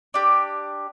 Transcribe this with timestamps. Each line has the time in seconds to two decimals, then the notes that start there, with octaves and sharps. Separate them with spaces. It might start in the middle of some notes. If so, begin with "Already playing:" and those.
0.14 D4 G4